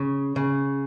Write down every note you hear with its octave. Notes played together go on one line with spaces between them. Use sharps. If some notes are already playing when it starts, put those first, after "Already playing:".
Already playing: C#3
C#3